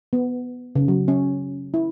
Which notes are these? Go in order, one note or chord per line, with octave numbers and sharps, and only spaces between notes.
B3
C#3
F#3
C#4
E4